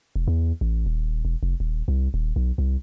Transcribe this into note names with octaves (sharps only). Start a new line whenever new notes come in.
E1
E2
A1
D#1
E1
F1
D#1
C2
D#1
B1
C2